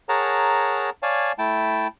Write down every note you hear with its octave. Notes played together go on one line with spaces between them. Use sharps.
G#4 A#4 C#5 F#5 A5 A#5
C#5 D5 F5 G#5 A5
A3 E4 G5 A5